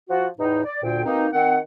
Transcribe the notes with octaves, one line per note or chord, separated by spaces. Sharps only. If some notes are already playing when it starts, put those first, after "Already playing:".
F3 F4 F#4
E2 A2 D#4
D5
D2 A#2 G5
B2 A#3 C4 D#4
D#3 C4 F#5